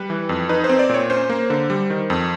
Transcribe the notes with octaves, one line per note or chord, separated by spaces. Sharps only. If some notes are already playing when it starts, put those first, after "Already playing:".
Already playing: G3 B4
E3
F2
D#4 B4
C5
C4
D5
A#2 C#5
C#4 C5
A#3
D3
G3
D#3
F2